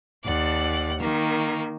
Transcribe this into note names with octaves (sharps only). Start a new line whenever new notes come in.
D#2 D5 F#5
D#3 A#3